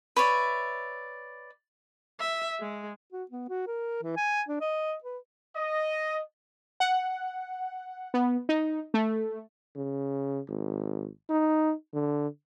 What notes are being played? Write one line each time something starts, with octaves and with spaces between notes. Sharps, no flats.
B4 C#5 D5 E5
E5
G#3
F#4
B3
F#4
A#4
E3
G#5
D4
D#5
B4
D#5
F#5
B3
D#4
A3
C#3
G#1
D#4
D3